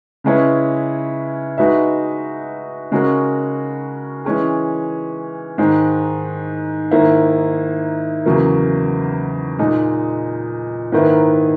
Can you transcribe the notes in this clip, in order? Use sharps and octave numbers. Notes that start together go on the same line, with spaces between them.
C#3 G#3 C#4 E4 B4
G#3 D#4 F#4 B4 E5
C#3 G#3 C#4 F#4 A#4
E3 G#3 C#4 G#4
G#2 D#3 G#3
G#2 D#3 A#3 E4
E2 C#3 F#3 A#3
A#2 G#3 D#4
G#2 D#3 A#3 E4 B4